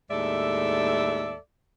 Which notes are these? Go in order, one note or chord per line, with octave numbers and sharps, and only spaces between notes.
D#2 A2 G#3 A4 D5 E5